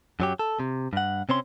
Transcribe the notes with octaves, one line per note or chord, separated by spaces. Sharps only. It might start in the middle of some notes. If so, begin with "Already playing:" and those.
F#2 F#3 G4
A4
C3
G2 F#5
C3 C4 C#4 C6